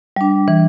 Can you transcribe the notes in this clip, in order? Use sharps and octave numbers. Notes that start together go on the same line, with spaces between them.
G3 D4
E3